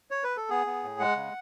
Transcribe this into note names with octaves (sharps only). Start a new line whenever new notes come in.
C#5
B4
A4
B3 G#4
B3
A2
G#3 F#5
C#3